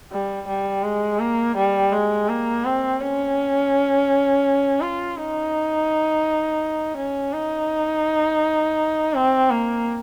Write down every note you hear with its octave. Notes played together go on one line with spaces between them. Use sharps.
G3
G3
G#3
A#3
G3
G#3
A#3
C4
C#4
F4
D#4
C#4
D#4
C4
A#3